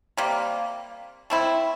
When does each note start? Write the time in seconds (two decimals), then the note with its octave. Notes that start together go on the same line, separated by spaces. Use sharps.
0.17 C3 G3 A#3
1.30 A3 C4 E4